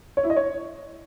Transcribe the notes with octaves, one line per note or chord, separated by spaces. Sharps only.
C#5
E4
D#5
C#5